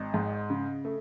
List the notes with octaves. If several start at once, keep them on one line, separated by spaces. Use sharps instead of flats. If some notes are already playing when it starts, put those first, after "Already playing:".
Already playing: G#1 D#5
G#2
C#3
A3